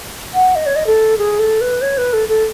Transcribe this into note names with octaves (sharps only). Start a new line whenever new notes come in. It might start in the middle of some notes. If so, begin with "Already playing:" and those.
F#5
D#5
C#5
D#5
A4
G#4
A4
B4
C#5
B4
A4
A4